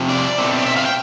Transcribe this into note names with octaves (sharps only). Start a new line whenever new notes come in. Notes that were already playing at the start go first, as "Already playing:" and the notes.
Already playing: C3 F3
D5
B2 A3 C4
D5
E5
F5
G5